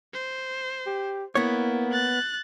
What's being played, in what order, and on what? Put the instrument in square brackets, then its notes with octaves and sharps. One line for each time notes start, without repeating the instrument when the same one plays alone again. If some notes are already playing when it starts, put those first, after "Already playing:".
[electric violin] C5
[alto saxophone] G4
[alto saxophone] A#3 [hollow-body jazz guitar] B3 C#5 [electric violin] E4
[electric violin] F#6 A6